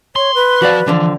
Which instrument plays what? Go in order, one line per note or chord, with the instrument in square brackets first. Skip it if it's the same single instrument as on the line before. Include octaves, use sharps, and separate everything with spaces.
[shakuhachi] C#5 [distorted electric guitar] C6
[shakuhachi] B4
[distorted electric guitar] F3 C5 [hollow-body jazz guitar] F#4 D5 F5
[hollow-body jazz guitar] D3 F3 [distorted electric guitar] E3